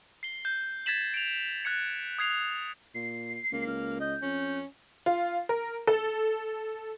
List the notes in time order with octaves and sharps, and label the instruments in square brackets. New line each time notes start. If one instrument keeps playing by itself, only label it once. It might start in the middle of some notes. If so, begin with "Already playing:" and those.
[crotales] C7 G7
G6
G#6 A6 B6 E7 F#7
D7 F7
F#6 G#6 C#7
D#6 G#6 C7 F7
[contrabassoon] A#2 [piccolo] C7
[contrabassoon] C#2 [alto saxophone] A#3
[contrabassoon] C#2 [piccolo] F6
[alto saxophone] D#5 [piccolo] G6
[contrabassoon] F2 [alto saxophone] C#4
[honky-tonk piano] F4
A#4
A4